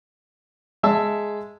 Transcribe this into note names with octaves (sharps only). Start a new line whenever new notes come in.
G#3 E5 A5 E6